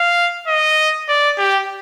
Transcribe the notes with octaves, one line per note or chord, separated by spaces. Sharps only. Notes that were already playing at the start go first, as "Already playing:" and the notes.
Already playing: F5
D#5
D5
G4